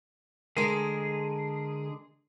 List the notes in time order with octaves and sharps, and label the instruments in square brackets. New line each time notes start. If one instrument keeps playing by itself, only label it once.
[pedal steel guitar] D3 G#4 [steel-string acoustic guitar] G#3 A#4